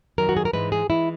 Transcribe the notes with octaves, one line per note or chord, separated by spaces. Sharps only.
F#2 D#3 F#3 A#4
F#4
G#4
A#4
G#2 E3 G#3 B4
G#4
E3 G#3 E4